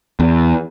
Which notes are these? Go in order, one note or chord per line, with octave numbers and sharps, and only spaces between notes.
E2